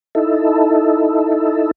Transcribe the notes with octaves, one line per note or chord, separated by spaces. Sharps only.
D#4 E4 A4